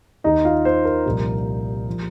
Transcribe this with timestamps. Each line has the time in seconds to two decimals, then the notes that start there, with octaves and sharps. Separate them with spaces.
0.24 D#2 D#3 D#4 D#5
0.45 F4 F5
0.65 C5
0.85 A#4
1.06 C2 A#2 F3
1.88 F3